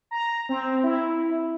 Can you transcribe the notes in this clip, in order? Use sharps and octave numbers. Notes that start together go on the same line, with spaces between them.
A#5
C4
E4